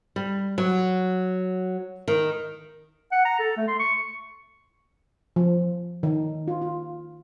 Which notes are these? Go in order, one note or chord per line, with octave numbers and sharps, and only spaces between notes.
G3
F#3
D#3
F#5
A#5
A4
A3
C6
C#6
F3
D#3
F4
F4